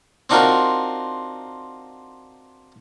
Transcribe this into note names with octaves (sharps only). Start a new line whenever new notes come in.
C4 D4 D#4 F4 F#4 A#4